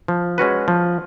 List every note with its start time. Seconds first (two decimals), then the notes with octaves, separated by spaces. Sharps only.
0.08 F3
0.38 G#3 C#4 F#4 B4
0.68 F3